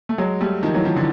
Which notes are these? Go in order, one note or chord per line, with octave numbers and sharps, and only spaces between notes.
A3
F#3 G#3
G3 A3
D#3 F3
E3 F#3
D#3 F3
D3 E3